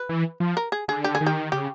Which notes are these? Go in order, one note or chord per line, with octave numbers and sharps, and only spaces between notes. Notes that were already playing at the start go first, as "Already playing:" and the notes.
Already playing: B4
E3
F3
A#4
G#4
D3 G#4
G4
G#4
D#3
G4
C#3 G4